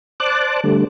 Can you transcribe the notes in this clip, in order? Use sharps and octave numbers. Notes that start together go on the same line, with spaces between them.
C5 D5 A5 D6 F#6
D3 G3 A3